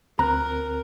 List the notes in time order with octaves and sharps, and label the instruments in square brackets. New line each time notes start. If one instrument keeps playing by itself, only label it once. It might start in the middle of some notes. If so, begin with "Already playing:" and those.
[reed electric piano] D2 C4 F#6 [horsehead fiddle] A#4 [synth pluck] A#5